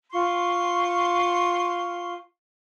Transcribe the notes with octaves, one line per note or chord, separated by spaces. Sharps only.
F4 C6 C#6